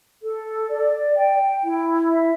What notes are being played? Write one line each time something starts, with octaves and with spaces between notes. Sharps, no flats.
A4
D5
G5
E4
E5